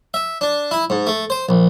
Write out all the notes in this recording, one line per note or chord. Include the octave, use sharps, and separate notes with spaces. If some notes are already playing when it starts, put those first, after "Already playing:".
E5
D4
E4
G#2
A3
C5
A#1